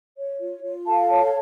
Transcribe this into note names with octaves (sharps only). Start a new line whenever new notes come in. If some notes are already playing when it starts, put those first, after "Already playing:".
C#5
F4
F4
A4 F5 A5
C#5